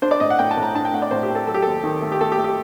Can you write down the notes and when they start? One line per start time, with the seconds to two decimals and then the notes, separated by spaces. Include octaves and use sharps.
0.02 D4 C5
0.11 D5
0.20 A2 D#5
0.30 F#5
0.39 A2 G5
0.51 A5
0.57 A2
0.63 A#5
0.75 D4 A5
0.85 G5
0.93 A3 F#5
1.02 D5
1.11 A2 C5
1.23 G4
1.30 A3
1.35 A4
1.47 F#3 A4
1.54 G4
1.62 D#2 A4
1.83 D#3
2.02 A3
2.12 G4
2.21 A3 A4
2.32 G4
2.38 A3
2.44 G4